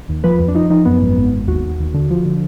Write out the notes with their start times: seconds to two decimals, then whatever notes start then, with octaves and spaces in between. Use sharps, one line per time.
0.09 D#2
0.24 F3 B4
0.39 F2
0.48 D4
0.54 F3 D#4
0.70 F3 D#4
0.85 F#2 B3
1.02 G#1
1.17 G#1
1.32 G#1
1.47 D#2 F#4
1.64 D#2
1.79 D#2
1.94 D3
2.10 F3
2.25 D3